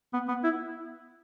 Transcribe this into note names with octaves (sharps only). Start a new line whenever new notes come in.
B3
B3
E4